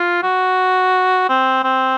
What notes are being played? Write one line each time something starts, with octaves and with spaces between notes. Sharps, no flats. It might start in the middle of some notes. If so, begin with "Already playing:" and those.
Already playing: F4
F#4
C4
C4